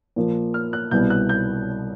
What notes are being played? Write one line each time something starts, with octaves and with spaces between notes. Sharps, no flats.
A#2 F3 A#3
F6
F#6
C2 B2 G3 B3 G6
F#6
G6